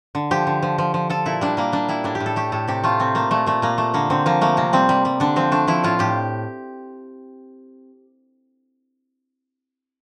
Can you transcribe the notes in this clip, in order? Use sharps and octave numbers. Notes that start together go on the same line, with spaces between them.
D3
F3 G4
D3
F3
F3
F3
F3 A4
A#2 E4
G3 D4
G3 A#3
G3 D4
G3 E4
A2 D4
G4
A2
A4
A3 G4
A2 A4
C3 G4
A3 F4
C3 C4
A3 A#3
A#2 A3
A#2 A3
A#2 A#3
A3
D3 A#3
D3 C4
F3 A#3
A3 A#3
C3 A#3
G3 C4
G3
G3
D3 D4
F3 C4
A3 D4
F3 E4
A2 F4
A2 G4